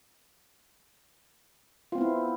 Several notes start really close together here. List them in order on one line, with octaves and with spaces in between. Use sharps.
F4 C4 B3 E4